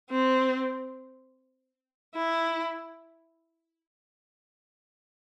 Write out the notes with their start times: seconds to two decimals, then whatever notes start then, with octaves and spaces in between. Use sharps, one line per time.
0.10 C4
2.15 E4